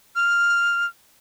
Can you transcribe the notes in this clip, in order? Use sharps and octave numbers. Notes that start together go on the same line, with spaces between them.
F6